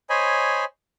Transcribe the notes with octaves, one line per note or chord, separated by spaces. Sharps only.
C5 C#5 D#5 G#5 B5